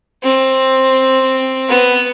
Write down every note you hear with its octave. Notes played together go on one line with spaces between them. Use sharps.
C4
B3